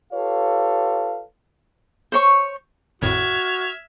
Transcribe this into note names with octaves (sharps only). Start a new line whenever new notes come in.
F4 G4 A4 B4 C#5 F5
C5 C#5 C#6
G#1 F2 A2 F#4 E5 F6 G#6